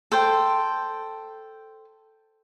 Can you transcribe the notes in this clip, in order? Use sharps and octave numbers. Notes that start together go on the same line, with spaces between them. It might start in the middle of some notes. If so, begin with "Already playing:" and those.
A4 C5 G5